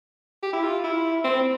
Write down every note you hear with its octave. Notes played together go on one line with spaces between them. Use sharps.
G4
E4
F4
E4
C4